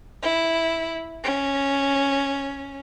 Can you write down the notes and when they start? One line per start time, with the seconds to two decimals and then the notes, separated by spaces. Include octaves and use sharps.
0.22 E4
1.23 C#4